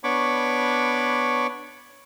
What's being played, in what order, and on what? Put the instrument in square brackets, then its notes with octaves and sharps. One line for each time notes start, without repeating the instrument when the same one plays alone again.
[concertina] B3 D4 C#5 B5 C#6 D6